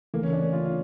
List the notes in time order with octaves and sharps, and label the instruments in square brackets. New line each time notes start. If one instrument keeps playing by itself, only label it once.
[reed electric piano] D2 C#3 E3 A3 [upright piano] A#3
[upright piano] C#4
D4
C#4
F4
F4